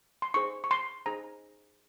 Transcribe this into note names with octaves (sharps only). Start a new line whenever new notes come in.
C6
D#4 G#4 C5 C#6
C#6
C6
D#4 G#4 C5 A#5